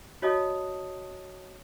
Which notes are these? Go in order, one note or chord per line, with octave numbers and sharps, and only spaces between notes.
F#4 C#5 D#5 A5 D#6